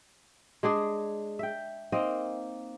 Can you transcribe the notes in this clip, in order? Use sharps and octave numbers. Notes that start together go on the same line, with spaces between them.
G#3 D4 G#4 D5
E5 G5
A#3 C4 D#4 D#5